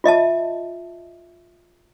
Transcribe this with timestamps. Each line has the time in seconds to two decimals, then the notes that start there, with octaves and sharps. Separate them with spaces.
0.04 F4 D#5 E5 A5